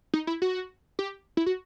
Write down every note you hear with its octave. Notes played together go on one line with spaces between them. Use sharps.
D#4
E4
F#4
G4
E4
F#4